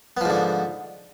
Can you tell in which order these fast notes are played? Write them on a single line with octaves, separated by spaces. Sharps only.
B3 F3 G#2 D3